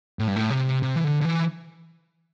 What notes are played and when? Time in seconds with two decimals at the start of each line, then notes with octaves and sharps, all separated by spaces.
0.19 A2
0.28 G2
0.36 A2
0.50 C3
0.83 C3
0.96 E3
1.04 D3
1.21 D3
1.25 E3